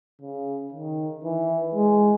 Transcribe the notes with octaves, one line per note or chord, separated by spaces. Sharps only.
C#3
D#3
E3
G#3